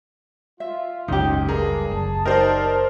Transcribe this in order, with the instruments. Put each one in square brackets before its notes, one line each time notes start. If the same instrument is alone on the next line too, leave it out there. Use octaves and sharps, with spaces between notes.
[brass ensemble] F4 [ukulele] E5
[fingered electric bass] F#1 C#2 C#4 [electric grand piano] G#2 [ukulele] D#4 G4
[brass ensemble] G2 D4 [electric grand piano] G#4 [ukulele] A#4
[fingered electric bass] F#1 [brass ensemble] A5
[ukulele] D#4 G4 D#5 [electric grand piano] A#4 C5 D5